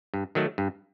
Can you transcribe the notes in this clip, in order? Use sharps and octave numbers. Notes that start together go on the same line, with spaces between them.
G2
D#3 F#3 A3
G2